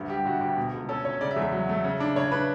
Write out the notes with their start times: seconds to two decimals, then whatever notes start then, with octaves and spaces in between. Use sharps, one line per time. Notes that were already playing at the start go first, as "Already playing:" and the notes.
Already playing: D2 G2
0.10 G3 G4
0.25 D2 F#4
0.41 D2 G4
0.57 B2
0.74 C#2
0.89 C#4 A4
1.04 C#4 C#5
1.21 C#3 D5
1.31 E5
1.36 E2
1.42 E5
1.52 F#3
1.69 A3
1.84 C#3
2.00 D4
2.16 C#3 C#5
2.31 D4 B4